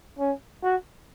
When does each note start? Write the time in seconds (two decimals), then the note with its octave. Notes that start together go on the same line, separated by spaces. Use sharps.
0.19 C#4
0.63 F#4